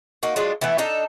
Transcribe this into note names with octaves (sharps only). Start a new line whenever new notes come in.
A#3 D#4 F#4
F#3 G#3 D4 F4
E3 A3 B3 E4
D4 D#4 A4 A#5